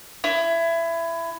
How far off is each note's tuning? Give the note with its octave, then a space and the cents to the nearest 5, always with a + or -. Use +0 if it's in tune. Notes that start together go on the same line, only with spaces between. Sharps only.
E4 +20